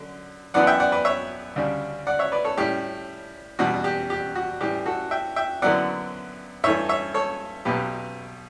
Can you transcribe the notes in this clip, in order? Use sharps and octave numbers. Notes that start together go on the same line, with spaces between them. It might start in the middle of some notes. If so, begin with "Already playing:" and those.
Already playing: F#2 D3
F#2 E3 B3 D4 D5 F#5
E5 G5
D5 F#5
B4 D5
C#5 E5
D2 C#3 G3 D4
D5 F#5
C#5 E5
B4 D5
A4 C#5
A2 G3 C#4 E4 G4
E2 B2 G3 D4 F#4
G4
G4
F#4
A2 E3 G3 G4
F#4 A4
E5 G5
E5 G5
F#2 D3 F#3 B3 E4 D5 F#5
G2 E3 A3 C#5 E5
C#5 E5
A4 C#5
B1 B2 F#3 G4 B4